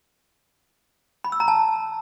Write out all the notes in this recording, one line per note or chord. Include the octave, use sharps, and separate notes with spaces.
B5
E6
A#5
A5